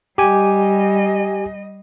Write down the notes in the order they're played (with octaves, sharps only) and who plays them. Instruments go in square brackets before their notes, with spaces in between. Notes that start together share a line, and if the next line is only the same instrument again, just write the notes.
[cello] G3 D#5 [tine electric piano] G4 G#5